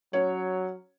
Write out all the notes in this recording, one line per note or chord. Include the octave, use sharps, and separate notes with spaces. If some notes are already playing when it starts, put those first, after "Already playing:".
F#3 C#4 C#5